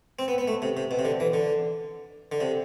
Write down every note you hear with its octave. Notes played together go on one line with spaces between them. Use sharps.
C4
B3
B3
A3
C3
C3
B2
C3
D3
E3
D3
D3
C3